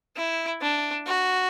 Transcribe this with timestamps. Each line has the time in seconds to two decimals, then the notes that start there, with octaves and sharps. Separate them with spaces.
0.16 E4
0.61 D4
1.06 F#4